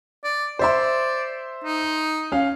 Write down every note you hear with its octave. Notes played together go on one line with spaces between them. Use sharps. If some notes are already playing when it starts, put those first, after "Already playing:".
D5
C5 D5 E5 C6
D#4
C#4 F5